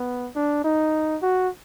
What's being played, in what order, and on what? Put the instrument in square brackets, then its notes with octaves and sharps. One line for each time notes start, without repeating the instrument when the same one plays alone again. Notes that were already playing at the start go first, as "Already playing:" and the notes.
Already playing: [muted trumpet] B3
D4
D#4
F#4